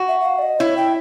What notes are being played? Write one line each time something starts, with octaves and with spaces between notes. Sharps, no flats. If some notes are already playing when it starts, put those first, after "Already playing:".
Already playing: F#4
E5
E5
F5
D5
D#5
E4 C#5
G5